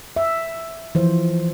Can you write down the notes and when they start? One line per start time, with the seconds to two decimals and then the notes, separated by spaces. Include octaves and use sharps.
0.16 E5
0.95 E3 F3 C5